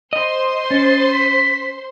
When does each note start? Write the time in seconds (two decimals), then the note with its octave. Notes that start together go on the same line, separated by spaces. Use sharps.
0.13 C5 D#5 C6
0.71 C#4 A6
1.12 B6